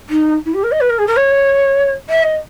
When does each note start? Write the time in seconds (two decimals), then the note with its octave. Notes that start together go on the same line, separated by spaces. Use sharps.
0.09 D#4
0.46 E4
0.54 G4
0.63 A#4
0.72 D#5
0.81 B4
0.90 A#4
0.98 G#4
1.07 A#4
1.17 C#5
2.09 E5
2.23 D#5